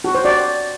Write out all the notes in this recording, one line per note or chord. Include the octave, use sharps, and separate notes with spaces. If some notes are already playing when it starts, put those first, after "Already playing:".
F#4
C5
D5